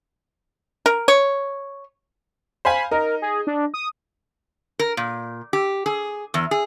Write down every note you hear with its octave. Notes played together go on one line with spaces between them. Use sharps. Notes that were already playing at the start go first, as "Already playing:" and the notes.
A#4
C#5
C5 F5 G#5 B5
D#4 A#4
G#4
D4
D#6
A#4
A#2
G4
G#4
E2
G#4